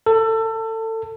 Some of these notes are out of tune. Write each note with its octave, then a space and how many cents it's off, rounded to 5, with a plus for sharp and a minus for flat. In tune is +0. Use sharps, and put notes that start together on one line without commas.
A4 +25